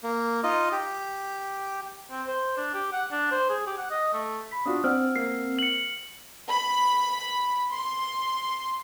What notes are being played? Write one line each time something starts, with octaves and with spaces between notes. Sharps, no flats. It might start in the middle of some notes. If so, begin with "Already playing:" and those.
A#3
D#4 F4 D#5
G4
C4
C5
D4
G4
F#5
D4
C5
G#4
G4
F#5
D#5
A3
B5 B6
D4 F4 F#4 D#6
C4 C5 D5 F#5 E6 F6
A#3 C7
C#7 F#7
B5
C6